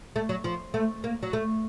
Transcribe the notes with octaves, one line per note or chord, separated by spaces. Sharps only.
A3
F#3
F3
A3
A#3
F#3
A3